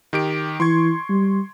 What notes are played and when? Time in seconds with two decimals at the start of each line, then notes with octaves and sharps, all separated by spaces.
0.13 D#3 G4 D7
0.60 E3 C6 C#6 G#6
1.10 G3